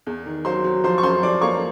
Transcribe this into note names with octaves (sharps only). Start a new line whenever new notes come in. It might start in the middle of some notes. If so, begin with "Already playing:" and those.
E2
D#3
F#3 C5 C6
F#3
F3 C5 C6
C#6
F#2 C5 C6
F3 D5 D6
A#3 C#5 C#6